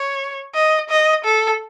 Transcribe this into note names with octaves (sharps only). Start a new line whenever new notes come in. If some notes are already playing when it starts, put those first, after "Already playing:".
Already playing: C#5
D#5
D#5
A4